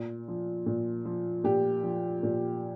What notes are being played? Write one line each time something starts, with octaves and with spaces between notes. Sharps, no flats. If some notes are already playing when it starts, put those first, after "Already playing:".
Already playing: A#2
F3
A#2
F3
A#2 G4
F3
A#2